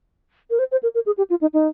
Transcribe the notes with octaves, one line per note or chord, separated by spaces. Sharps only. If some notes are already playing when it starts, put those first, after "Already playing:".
A#4
C5
C5
A#4
A#4
G#4
G4
F4
D#4
D#4